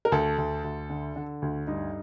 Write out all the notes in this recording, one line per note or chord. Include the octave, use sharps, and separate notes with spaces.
A#4
D2 A4
D2
D2
D3
D3
D2
G2 D#4